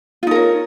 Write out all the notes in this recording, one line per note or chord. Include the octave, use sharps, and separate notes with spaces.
D#4 F4 A#4 C#5